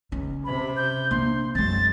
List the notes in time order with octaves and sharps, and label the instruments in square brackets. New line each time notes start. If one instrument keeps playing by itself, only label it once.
[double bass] C#2 [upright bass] C#4
[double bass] C3 [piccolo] B5
[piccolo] G6
[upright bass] A#3 D4 [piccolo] C6
[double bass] F#2 [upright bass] G#3 C4 [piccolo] A6